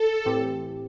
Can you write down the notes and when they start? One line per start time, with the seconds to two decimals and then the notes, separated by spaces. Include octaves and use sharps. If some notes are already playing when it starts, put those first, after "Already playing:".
Already playing: A4
0.25 A2 E3 C4 G4